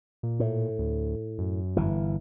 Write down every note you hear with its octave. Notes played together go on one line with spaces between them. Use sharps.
A#2
A2
D2
F#2
G1 E3